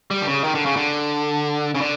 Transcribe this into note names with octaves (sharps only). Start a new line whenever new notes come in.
G3
D3
C#3
D#3
D3
C#3
D3
C#3
D3